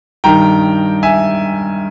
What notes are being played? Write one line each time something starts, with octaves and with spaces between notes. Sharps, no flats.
G2 D#3 G5 A#5
E5 G#5